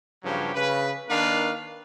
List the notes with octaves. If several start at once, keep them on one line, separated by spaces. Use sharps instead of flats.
G2 C#3 F3 F#3 G4
C#3 B4
D#3 A#3 D4 B4 F5